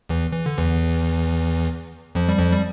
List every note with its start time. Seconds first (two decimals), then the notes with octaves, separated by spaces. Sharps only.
0.09 E2 E3
0.32 E3
0.46 D3
0.58 E2 E3
2.15 F2 F3
2.29 G3
2.38 F2 F3
2.53 G3